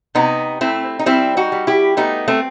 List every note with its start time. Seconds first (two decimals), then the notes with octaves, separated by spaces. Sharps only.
0.15 C3 B3 D#4
0.61 A3 C4 E4
0.99 D#4
1.06 G3 C4 E4
1.37 D#4 F#4
1.52 G3
1.67 E4 G4
1.97 A3 B3 D#4
2.28 A3 C4